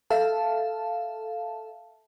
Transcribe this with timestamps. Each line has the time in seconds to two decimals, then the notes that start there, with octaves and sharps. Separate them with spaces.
0.10 A4 E5 F5 A5